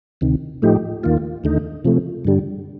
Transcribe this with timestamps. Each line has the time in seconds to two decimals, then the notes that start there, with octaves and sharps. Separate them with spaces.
0.21 D2 C3 D#3
0.62 A2 F3 A3 D#4 G4
1.03 D#2 D#3 A#3 F4
1.44 D#2 D3 A3 D#4
1.85 C3 F3 A3
2.25 G2 D3 G3